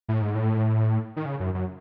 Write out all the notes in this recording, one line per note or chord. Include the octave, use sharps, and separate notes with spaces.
A2
G#2
A2
D#3
C#3
F#2
F#2